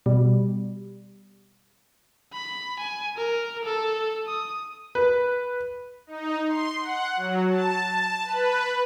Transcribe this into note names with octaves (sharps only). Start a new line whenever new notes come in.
B2 G3
B5
G#5
A#4
A4
D#6
B4
D#4
C6
F#5
F#3
A5
A5
B4